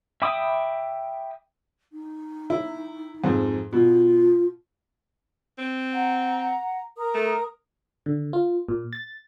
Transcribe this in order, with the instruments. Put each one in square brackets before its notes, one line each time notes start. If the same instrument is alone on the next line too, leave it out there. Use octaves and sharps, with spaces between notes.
[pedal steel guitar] E5 G5 B5 D6 D#6
[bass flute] D#4
[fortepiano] E4
F2 G#2
[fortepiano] B2 [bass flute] F4
[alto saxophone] C4
[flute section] F#5 A#5
A#4 A#5 D#6
[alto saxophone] A3
[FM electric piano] D3
F4
A#2
A6